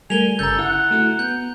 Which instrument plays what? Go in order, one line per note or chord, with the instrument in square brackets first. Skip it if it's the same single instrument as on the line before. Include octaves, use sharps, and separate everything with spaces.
[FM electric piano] G3 A3 A#4 [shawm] G#5 [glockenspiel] F7 G7
[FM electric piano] G1 C#3 [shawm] A4 [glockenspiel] A#5 G6
[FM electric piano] E4 [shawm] F#5
[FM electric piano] A3 E4 F#4
[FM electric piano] B3 [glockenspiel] G6